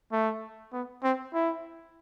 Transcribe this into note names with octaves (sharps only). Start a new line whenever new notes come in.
A3
B3
C4
E4